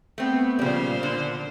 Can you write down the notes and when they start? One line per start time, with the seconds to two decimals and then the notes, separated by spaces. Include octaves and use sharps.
0.18 A3 B3 C4
0.59 A#2 C#3 F3 G3 C5
1.03 D3